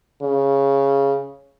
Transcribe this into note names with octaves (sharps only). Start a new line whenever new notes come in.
C#3